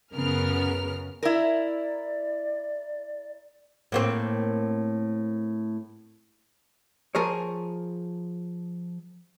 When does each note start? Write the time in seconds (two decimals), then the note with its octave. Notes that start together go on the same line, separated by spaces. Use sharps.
0.14 F#2 C#3 B3 A#4 F6
1.23 E4 A#4 D5
3.92 A2 A#3 C4
7.15 F3 G#4 A#4 C#5